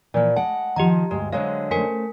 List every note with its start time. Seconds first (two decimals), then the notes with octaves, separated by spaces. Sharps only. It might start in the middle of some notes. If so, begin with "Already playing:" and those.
0.14 A#2 E3 F3
0.36 G#3 F#5 A5
0.76 D#3 F3 G4 D#5 A#5
1.11 D2 G2 G#3
1.33 D3 F#3 G#3 C5 F5
1.71 A3 C#4 A#4 C5 G#5 B6